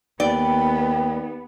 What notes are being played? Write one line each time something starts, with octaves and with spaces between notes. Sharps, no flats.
D#2 B3 D5 G5